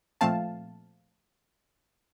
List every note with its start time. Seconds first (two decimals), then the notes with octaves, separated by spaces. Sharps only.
0.21 A#2 F3 A3 C4 F5 A5